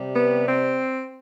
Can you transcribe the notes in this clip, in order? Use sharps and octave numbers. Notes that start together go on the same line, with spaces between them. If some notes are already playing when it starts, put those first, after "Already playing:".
Already playing: C3 G3
B3
C4